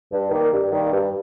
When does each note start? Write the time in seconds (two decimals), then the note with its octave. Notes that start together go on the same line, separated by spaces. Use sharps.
0.11 G2
0.31 D#3 G3 A#3
0.52 G2
0.72 D#3 G3 A#3
0.92 G2